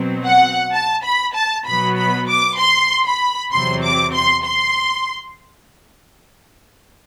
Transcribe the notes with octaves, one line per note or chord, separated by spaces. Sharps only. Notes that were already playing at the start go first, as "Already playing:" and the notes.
Already playing: B2 F#3 C4
F#5
A5
B5
A5
B2 F#3 B3 B5
B5
D6
C6
B5
E2 C3 F#3 C4 C6
D6
C6
C6